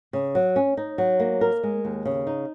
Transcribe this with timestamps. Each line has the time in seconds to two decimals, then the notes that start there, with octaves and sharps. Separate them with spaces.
0.13 C#3
0.35 F#3
0.56 C#4
0.77 D#4
0.98 F#3
1.20 A#3
1.41 A#4
1.63 G#3
1.85 D#2
2.05 C#3
2.27 D#4